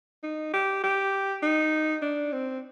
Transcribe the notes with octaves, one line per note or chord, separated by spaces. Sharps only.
D#4
G4
G4
D#4
D4
C4